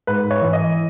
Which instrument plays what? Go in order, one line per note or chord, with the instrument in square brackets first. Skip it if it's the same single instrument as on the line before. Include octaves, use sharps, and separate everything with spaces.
[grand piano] G#2 B4
C#5
E3
D#5